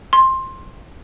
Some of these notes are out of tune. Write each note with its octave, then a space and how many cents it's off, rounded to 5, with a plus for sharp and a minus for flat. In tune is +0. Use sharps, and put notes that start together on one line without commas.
C6 +15